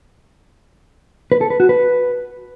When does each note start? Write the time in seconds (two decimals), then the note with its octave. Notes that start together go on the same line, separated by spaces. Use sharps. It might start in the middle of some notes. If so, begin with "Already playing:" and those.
1.32 B4
1.41 A4
1.50 B4
1.60 F#4
1.69 B4